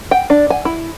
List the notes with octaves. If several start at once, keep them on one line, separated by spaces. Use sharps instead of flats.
G5
D4
G#5
E4